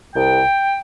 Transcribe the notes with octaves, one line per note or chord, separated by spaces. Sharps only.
C2 G5